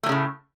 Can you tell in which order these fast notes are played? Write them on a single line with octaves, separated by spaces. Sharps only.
A3 F#3 C#3 A2